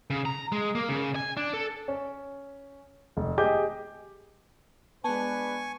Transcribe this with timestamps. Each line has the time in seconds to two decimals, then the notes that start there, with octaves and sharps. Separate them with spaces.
0.10 C#3
0.25 A#5
0.52 G#3
0.75 A#3
0.89 C#3
1.16 G#5
1.37 D4
1.54 A4
1.88 C#4
3.17 F1
3.38 G4 G#4 D#5 D6 G6
5.04 G#3 B3 D4 B4 G#5 A5 C#6